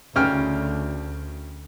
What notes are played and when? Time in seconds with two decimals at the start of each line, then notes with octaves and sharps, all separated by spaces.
0.16 D2 C#3 G5 F6